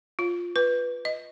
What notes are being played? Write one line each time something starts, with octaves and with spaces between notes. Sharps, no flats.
F4
B4
D#5